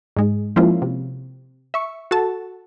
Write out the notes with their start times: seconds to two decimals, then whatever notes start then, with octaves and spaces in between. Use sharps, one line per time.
0.17 G#2 G#3
0.56 F3 G#3 A#3 C#4 E4 F4
0.82 C3
1.74 E5 C#6
2.11 F#4 A4 A5